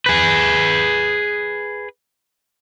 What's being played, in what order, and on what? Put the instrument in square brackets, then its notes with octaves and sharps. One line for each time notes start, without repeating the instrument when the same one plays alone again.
[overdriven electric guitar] G#4 B4